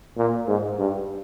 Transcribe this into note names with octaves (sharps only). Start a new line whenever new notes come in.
A#2
G#2
G2